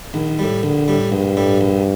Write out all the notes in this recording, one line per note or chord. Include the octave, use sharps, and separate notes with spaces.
A#1 D#3
A2 G3
A#1 D3
A2 G3
A#1 G2
A2 G3
A#1